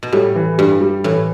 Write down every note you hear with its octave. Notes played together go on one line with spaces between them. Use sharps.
B2
A2 G3
E3
G2 G3
G3
A2 E3